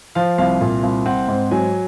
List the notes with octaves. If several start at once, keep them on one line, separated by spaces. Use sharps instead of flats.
F3 F5
C2 F5
A#2
C2
C4 F#5
G#2
F#3 G#5